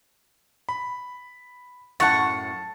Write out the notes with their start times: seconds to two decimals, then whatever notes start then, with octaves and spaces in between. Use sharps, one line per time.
0.69 B5
2.00 F#2 A2 F#5 A5 C#6 F#6 A6